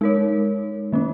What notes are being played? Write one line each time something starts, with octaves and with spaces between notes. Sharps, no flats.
G#3 D#4 A#4 C#5
D#3 A#3 C#4